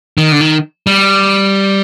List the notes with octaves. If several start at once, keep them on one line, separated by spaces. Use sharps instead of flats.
D#3
D3
D#3
G3